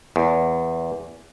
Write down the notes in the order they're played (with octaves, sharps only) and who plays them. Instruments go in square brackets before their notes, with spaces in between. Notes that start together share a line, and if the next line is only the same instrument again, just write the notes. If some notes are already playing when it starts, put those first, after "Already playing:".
[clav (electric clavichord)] E2